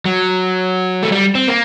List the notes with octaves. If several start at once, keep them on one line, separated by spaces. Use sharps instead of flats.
F#3
A3
G3
C4
A#3